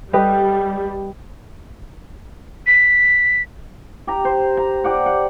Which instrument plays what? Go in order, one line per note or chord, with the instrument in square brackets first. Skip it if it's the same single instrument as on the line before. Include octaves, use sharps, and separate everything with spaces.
[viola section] G3 [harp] G4 B4 D#5
[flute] B6
[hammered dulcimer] G4 A#5
C5
A#5
G4 D5 F#5
F#5